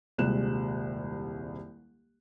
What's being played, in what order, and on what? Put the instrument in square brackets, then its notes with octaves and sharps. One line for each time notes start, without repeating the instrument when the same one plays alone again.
[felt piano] D#1 C2 G3 G#3 F#6 E7